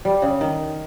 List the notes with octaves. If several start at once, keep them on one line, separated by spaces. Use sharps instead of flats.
G3
C#3
D#3